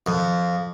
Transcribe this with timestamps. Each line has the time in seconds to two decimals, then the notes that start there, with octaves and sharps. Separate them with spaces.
0.06 F2